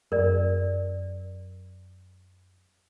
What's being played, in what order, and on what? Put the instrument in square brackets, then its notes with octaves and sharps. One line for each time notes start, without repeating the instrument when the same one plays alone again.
[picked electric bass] F#2 [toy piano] A#4 D5